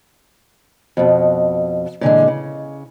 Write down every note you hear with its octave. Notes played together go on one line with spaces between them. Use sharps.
F2 B2
A#2 D3 E3 G#3
C#3